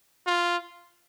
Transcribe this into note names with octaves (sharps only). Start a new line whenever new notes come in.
F4